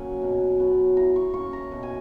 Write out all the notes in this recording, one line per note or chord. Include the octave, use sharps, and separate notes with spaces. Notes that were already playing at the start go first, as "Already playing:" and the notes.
Already playing: A#2 F#3 A#3 C#4 F#5 G#5
B2
F#3 B3
E3 A#5
C#6
A#3 C#4 C#6
A#5
B2
G#5